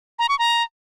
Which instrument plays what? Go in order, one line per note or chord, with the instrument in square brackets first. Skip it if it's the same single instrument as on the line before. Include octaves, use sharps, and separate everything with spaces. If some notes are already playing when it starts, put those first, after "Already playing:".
[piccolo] A#5
C#6
A#5